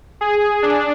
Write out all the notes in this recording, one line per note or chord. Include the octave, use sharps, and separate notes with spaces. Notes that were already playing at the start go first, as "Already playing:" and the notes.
G#4
D4